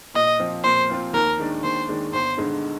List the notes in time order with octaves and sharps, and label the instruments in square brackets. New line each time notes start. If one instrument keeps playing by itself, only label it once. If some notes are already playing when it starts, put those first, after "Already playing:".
[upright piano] A#2 [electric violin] D#5
[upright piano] F3 C4 F4
[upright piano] A#2 [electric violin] C5
[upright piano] F3 C4 F4
[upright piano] D#2 [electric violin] A#4
[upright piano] D#3 G#3 D4
[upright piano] D#2 [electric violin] C5
[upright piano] D#3 G#3 D4
[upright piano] G1 [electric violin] C5
[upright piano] G2 D3 G#3 D#4